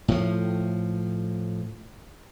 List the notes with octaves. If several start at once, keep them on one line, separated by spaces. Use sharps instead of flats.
A2 F3